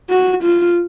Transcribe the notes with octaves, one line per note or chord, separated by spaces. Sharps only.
F#4
F4